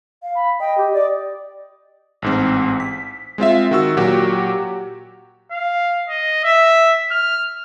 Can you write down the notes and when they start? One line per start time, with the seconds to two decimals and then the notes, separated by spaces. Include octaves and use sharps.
0.23 F5
0.35 B5
0.60 D#5 G5
0.78 G4
0.93 D5
2.22 A1 G#2 C4
2.80 B6
3.38 G#3 C4 F4 E5
3.71 D#3 F#4 E6
3.97 A#2 F#3 F#4 G4
5.51 F5
6.09 D#5
6.44 E5
7.11 F6